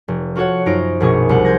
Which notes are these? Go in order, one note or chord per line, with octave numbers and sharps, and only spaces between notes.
F1
F4 F#4 A4 C#5 F#5
F#2 D#4 F4 C5 A#6 D7
A#1 B2 G#4 C#6
C2 C5 F#5
C6 G6 G#6 A#6